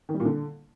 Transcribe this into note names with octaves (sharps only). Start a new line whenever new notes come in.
D#3
G3
A#2
D3